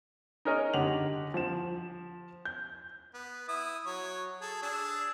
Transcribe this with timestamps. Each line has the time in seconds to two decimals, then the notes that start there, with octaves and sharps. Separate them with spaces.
0.45 D#4 G#4 A#4 C#5 D#5
0.73 D3 G4 F#5 F7 F#7
1.34 F3 E7
2.45 G6
3.14 B3
3.48 E4 D#6
3.86 F#3 C#5
4.41 G#4 A4
4.62 D4 G#4 E6